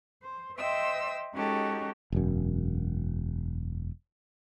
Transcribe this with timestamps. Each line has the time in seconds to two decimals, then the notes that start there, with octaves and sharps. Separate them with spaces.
0.23 C5
0.58 C5 D#5 E5 G5 E6
1.34 G#3 C#4 D#4 F#4 G4 A4
2.12 E1 F#2